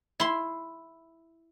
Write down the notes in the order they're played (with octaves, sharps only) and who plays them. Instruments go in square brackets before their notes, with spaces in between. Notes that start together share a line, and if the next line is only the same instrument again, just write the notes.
[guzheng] E4 C6